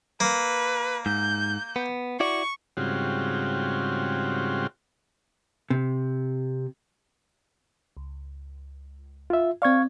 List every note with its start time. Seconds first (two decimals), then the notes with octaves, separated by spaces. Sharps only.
0.20 A#3 B4
1.06 G#2 G6
1.76 B3
2.20 E4 F#4 D5 C#6
2.77 G#2 C#3 G3 C4 F4 F#4
5.70 C3
7.97 C#2
9.30 F4 E5
9.62 C4 D5 F5 C#6 G#6